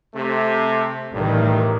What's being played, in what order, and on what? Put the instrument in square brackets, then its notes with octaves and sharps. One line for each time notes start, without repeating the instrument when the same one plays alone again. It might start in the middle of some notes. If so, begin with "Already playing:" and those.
[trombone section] C3 A3
[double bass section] A1 D#3 [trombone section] G2 G3 A3